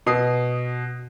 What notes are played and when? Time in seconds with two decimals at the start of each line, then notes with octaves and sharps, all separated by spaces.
0.06 B2 D#6 C7